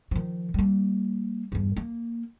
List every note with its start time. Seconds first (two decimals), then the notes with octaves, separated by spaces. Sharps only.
0.11 D#3 F3
0.54 G3 A#3
1.52 E2 G2
1.77 A#3